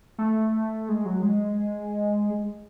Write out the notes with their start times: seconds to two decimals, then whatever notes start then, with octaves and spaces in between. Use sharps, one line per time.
0.18 A3
0.89 G#3
1.06 F#3
1.22 G#3